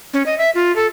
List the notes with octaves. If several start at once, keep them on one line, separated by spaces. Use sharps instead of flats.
C#4
D#5
E5
F4
A4